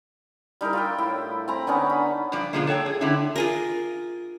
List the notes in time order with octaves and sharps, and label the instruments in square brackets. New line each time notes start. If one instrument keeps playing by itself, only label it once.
[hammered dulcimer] G3 D#4 E4 A#4
F4 E5 G5
A2 E4
C4 A#5 B5
D3 B3 C#4 D#4
B5
[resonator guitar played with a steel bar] G2 F3 D5
B2 D3 D#3 F3 G#3 A#3
A4 C#5 F#5 G5
G#4
D3 A3 C#4 D4 E4
[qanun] F4 G#4 A#4